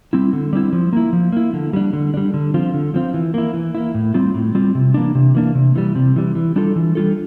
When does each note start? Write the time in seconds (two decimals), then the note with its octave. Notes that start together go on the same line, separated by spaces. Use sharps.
0.13 G3 C4 E4
0.33 D3
0.53 G3 C4 E4
0.73 F3
0.93 A#3 E4
1.13 F3
1.32 A#3 E4
1.53 D3
1.73 G3 D4
1.93 D3
2.14 G3 D4
2.34 D3
2.54 F3 C4 F4
2.74 D3
2.94 F3 C4 F4
3.14 E3
3.34 A#3 E4
3.54 E3
3.75 A#3 E4
3.94 A2
4.14 G3 C4 F4
4.34 A2
4.55 G3 C4 F4
4.75 C3
4.94 E3 A#3 D4
5.15 C3
5.35 E3 A#3 D4
5.55 C3
5.76 E3 G3
5.95 C3
6.16 E3 G3
6.35 E3
6.56 G3 D4 F4 A4
6.76 E3
6.95 G3 D4 F4 A4